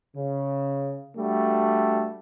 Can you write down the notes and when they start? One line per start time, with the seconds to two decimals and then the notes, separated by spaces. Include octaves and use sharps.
0.16 C#3
1.17 G3 A3 D4 F#4